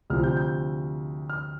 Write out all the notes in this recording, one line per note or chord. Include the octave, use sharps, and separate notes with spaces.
D2 C3 F3 F6
G6
G6
F6